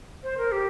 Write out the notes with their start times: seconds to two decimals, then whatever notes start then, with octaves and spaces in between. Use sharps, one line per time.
0.23 C5
0.38 A#4
0.52 G4